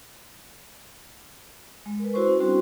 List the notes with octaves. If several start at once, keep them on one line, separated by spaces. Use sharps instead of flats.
G#3
A#4 B4
E4 F#4 C5 C6 C#6
C#4
G3 C4 D4 F#4 C6 C#6